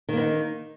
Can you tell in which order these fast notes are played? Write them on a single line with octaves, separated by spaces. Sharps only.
D#3 A#3 B3 D#4